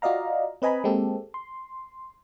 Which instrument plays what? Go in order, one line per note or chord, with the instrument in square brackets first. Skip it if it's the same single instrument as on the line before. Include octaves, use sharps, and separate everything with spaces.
[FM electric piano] F4 F#4 D5 D#5 F5 A#5
C4 B4 D#5 G#5 A#5 B5
G#3 A#3 C4 G4 A4
C6